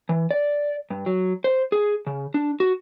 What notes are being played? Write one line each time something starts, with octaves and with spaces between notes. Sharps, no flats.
E3
D5
G2
F#3
C5
G#4
C#3
D4
F#4